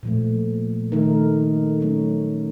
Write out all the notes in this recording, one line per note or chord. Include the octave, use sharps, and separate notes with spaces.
A#2 F3 A3
D#3 A3 D#4 A#4
F#3 A3 C#4